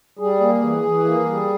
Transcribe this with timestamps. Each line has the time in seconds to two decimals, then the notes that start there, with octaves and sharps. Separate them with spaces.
0.19 G3 G#4
0.40 A#3
0.61 E3
0.84 E3
1.04 A#3
1.25 G3